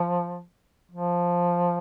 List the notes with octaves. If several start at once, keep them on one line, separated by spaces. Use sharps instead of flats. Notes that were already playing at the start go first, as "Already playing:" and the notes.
Already playing: F3
F3